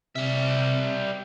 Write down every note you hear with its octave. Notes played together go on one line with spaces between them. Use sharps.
C3 G3 E5